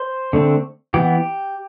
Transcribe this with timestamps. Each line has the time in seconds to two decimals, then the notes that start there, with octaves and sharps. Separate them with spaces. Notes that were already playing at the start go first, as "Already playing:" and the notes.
Already playing: C5
0.33 D3 A3 C4
0.94 E3 B3 G4